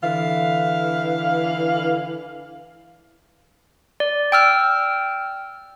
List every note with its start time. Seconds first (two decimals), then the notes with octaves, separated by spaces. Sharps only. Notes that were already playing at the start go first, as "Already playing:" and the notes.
0.03 D3 E3 F5
4.00 D5
4.32 G5 E6 F6